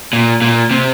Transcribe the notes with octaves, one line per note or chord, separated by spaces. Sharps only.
A#2
A#2
C3